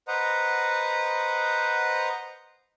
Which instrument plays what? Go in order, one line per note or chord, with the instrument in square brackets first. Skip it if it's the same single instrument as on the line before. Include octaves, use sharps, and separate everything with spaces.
[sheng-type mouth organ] B4 C5 D#5 F#5 A#5